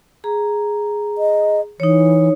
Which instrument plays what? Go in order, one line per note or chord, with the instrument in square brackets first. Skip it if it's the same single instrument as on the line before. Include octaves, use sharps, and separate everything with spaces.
[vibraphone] G#4 A#5
[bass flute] D#5
[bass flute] E3 [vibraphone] D#4 C#5